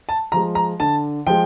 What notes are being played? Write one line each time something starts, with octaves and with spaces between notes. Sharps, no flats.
A5
F3 G#3 A#5
A#5
D3 A5
F3 G#3 G5